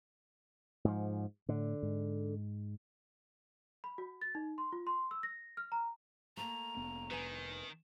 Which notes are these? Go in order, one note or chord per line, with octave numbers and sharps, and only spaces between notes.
G#2 F3
A2 D3
G#2
B5
F#4
A6
D#4
C6
F4
C6
E6
A#6
F6
A#5
A3 A#3 A#5
F1 B3
D#3 B4 G#5